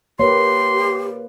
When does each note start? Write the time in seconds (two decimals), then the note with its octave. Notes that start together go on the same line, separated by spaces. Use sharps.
0.20 A#3 G4 B4 C#5 C6